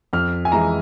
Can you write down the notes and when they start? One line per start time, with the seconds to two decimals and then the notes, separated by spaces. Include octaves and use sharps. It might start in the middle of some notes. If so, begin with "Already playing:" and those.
0.13 F2 F6
0.45 G#5
0.52 E3 G#3 A#5